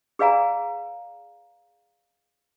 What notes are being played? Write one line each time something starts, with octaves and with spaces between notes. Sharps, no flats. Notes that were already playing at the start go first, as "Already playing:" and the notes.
G#4 B4 D5 F5 G#5 A#5